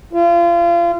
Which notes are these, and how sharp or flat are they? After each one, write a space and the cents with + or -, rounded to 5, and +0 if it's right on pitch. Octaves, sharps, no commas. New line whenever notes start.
F4 -30